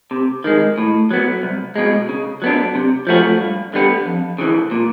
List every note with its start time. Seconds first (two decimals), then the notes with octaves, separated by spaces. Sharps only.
0.11 C3
0.44 D#3 G#3
0.78 A2
1.11 F#3 B3
1.43 C2
1.76 B2 G#3
2.09 C#3
2.42 F#3 B3 D4
2.75 C3
3.07 F3 A3 C#4 F#4
3.40 G2
3.74 D3 G3 B3
4.06 F2
4.38 C#3 E3
4.71 A#2